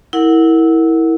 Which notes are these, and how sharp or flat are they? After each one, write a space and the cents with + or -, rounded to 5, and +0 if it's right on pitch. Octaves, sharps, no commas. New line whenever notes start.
E4 -20 A#4 -20 F#5 -5